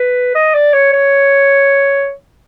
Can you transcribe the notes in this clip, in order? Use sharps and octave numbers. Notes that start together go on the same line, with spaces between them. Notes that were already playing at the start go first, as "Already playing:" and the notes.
Already playing: B4
D#5
D5
C#5
C#5